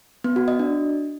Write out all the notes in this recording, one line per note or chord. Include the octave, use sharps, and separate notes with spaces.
B3
F#4
D#5
D4